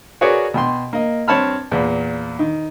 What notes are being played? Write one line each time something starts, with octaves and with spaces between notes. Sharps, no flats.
F#4 G#4 A#4 B4 C#5 D5
B2 G5 C6
A#3 D#5
G2 C4 C#5 A5 B5 F6
E2 A#2
D#3